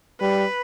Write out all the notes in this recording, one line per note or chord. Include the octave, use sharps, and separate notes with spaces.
G3 B4